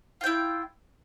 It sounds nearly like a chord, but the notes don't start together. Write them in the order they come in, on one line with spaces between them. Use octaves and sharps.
F4 G5 E4